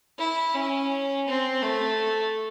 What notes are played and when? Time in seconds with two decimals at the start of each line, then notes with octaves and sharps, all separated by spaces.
0.19 E4
0.54 C#4
1.28 C4
1.63 A3